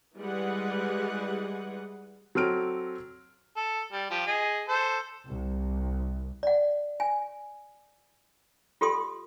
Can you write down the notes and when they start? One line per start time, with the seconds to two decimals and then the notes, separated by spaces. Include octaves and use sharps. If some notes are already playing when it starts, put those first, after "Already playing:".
0.17 E3 G3 G#3 G#4 B4 F#5
2.35 F#3 C4 A4 F6 D7
3.57 A4
3.93 G3
4.11 F3 G4
4.27 G#4 D#5
4.68 A4 C5
5.27 C2
6.43 D5 F#5
7.00 G#5
8.81 F4 G4 A4 C6 D#6